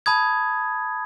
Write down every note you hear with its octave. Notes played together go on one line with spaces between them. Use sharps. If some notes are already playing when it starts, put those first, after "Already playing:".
A5 B5 D#6 G#6